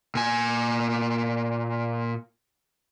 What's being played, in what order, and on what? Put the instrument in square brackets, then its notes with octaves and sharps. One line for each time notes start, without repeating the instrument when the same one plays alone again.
[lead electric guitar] A#2 G#5